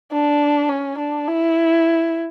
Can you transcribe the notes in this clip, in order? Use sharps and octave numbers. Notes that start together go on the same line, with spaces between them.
D4
C#4
D4
E4